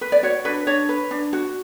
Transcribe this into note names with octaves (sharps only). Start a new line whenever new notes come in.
B4
D5
F#4 C#5
D4 B4
D4 C#5
B4
D4
F#4